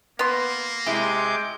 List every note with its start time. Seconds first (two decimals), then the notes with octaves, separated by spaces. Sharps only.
0.19 A#3 B3 C6
0.86 C3 G#3 E4 D6 G6